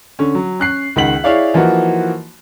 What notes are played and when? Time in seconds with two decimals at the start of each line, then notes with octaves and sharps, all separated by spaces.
0.19 D3 C#4
0.35 F#3
0.60 C#4 F#6 C7
0.96 C#2 D#3 F#5 B6 F#7
1.24 E4 G#4 C#5 D5 F5
1.54 E3 F3 A#3 D#4 F#4